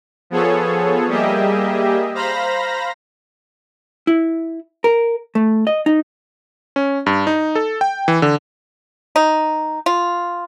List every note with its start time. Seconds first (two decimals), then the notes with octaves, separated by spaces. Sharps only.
0.30 F3 B3 G#4 A4 C#5
1.08 G3 A#3 G4 G#4 D#5 E5
2.15 C5 F5 A#5 B5 A#6
4.07 E4
4.84 A#4
5.35 A3
5.67 D#5
5.86 D#4
6.76 C#4
7.06 G2
7.27 D#4
7.55 A4
7.81 G5
8.08 E3
8.22 D3
9.16 D#4
9.86 F4